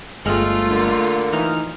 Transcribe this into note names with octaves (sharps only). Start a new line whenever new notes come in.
G1 G#3 A3 F4 F6
D3 A#3
E3 D#4 F6